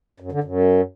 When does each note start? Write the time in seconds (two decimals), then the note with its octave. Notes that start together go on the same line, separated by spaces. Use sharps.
0.20 F#2
0.32 D3
0.44 F#2